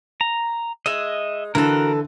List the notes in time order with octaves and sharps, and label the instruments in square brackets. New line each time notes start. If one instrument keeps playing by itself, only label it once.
[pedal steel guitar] A#5
[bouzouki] G#3 D#4 [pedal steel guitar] D#5 E5
[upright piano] D3 [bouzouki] E3 A4 [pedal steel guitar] F#4 A#4